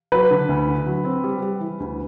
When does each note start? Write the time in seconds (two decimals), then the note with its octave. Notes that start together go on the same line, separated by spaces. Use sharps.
0.12 F#3 B4
0.31 D3
0.49 D2
0.67 D3
0.86 F#3
1.05 C4
1.24 G3
1.42 G3
1.60 E3
1.80 D2